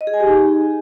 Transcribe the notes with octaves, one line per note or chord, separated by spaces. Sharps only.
D#5
G#4
G#5
G4
D#4